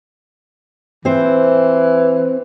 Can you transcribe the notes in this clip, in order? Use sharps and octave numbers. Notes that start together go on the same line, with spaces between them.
E3 C4 C5